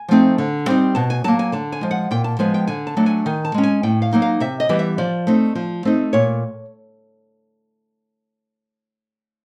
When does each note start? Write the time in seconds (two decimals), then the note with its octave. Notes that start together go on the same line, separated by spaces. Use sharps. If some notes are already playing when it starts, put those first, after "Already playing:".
Already playing: G#5
0.08 F3 A3 C4 D#4
0.38 D3
0.66 G3 C4 D#4
0.95 B2 A5
1.10 G#5
1.24 F#3 A#3 A5
1.39 G#5
1.52 D3 A5
1.72 G#5
1.81 F3 G#3
1.91 F#5
2.11 A#2 G5
2.24 A5
2.39 F3 G#3 B3 G#5
2.54 G5
2.67 D3 G#5
2.87 A5
2.97 F#3 A3 D4
3.06 G#5
3.26 D#3 G#5
3.45 A5
3.54 G#3 C#4
3.63 G#5
3.83 A2 G5
4.02 F5
4.13 F#3 A#3 D#4
4.22 F5
4.40 C3 E5
4.60 D#5
4.69 E3 G3 B3
4.79 E5
4.98 F3 D5
5.27 A3 C4 D#4
5.55 F3
5.85 A3 C4 D#4
6.13 A#2 C#5